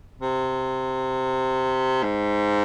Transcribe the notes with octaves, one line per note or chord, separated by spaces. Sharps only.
C3
G#2